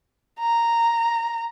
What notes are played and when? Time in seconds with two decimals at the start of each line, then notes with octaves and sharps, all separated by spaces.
0.40 A#5